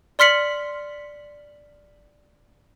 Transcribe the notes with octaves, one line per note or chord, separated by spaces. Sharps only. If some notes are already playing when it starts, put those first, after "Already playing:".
D5 C6 F6 B6 C#7 F#7